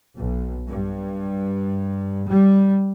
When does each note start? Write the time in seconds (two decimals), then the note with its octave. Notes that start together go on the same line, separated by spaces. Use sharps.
0.17 B1
0.67 G2
2.28 G3